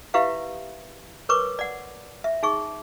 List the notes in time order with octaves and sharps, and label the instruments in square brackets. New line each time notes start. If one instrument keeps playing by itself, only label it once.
[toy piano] E4 G4 B4 E5 F5
A#4 B4 C#5 C#6 D6
D5 F#5
E5
D#4 G#4 C#6